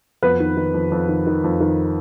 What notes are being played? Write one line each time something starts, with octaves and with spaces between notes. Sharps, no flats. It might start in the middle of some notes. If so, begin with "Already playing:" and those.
F2 B3 B4
D#3
D#3
F2
F2
D#3
D#3
F2
D#3